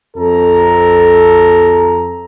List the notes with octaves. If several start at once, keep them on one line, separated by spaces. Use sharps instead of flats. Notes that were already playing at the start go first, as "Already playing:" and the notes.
F2 A4 A#5